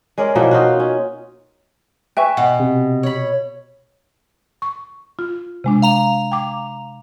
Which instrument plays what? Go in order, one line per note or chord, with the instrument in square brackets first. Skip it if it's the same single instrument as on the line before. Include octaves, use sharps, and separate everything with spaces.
[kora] G#3 C#4 A#4 D5
B2 E3 F3 A#3
D#4 F4 F#4
C#4
[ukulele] B4 E5 G#5 [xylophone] G5 C#6
[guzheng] B2 [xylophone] F#5
[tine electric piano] C3
[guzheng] C#5 B5
[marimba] C#6
F4
C3 G#3 D4
[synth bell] F5 A#5 F7
[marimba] G5 D6